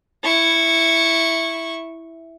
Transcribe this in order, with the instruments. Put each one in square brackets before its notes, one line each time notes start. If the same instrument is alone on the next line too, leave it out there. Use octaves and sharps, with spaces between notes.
[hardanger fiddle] E4 C#6